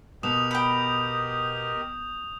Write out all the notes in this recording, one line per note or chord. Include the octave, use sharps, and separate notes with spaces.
B2 G4 A#4 D#5 D#6 E7 F7
G5 B5 G6